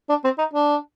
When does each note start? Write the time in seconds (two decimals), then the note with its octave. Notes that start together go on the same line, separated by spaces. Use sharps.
0.09 D4
0.24 C4
0.39 D#4
0.54 D4